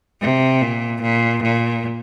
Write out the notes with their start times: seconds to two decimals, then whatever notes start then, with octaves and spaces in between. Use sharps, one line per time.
0.21 C3
0.62 A#2
1.01 A#2
1.42 A#2